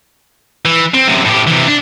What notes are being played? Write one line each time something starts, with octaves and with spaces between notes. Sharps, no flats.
E3
C4
F#2 C3
A2 G4
C3 E3
D4